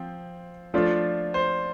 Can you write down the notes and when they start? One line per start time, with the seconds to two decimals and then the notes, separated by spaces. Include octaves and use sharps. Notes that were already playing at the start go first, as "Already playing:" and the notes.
Already playing: F3 C4
0.74 F3 A3 D4 F4
1.34 C5